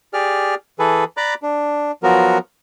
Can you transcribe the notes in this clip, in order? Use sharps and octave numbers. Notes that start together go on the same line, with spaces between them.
G4 G#4 D5 F6
E3 G#4 A4 B4
D5 A#5 B5 D6 F#6
D4
F3 F#3 B3 F#4 A#4